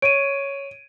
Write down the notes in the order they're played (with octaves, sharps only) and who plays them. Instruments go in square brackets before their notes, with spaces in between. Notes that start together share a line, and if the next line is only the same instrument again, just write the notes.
[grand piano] C#5 [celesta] D7 D#7